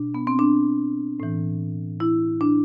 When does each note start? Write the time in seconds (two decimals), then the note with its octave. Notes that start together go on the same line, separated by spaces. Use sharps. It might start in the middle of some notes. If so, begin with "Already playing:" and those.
Already playing: B2 D4
0.14 B3
0.27 C4
0.39 D4
1.20 A2 E3
2.00 E4
2.41 D4